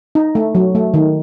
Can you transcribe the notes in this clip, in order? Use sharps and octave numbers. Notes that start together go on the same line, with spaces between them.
D#4
A3
F#3
A3
D#3